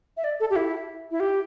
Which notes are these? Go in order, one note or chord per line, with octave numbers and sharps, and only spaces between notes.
E5
D5
A4
G4
E4
E4
G4